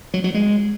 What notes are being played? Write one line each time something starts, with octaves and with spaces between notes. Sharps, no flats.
F#3
F#3
G#3